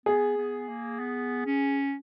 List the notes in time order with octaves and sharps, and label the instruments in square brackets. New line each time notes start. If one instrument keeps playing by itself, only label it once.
[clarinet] B3 [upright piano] G#4
[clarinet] B3
A#3
B3
C#4